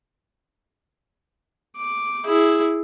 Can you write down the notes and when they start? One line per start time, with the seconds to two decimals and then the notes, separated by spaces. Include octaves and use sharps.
1.77 D6
2.26 E4 G#4